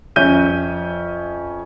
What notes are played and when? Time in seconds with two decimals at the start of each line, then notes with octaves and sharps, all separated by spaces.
0.16 F2 C#4 E5 G6 D#7